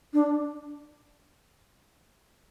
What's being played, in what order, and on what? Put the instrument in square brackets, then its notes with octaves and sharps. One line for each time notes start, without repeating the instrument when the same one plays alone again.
[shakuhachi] D4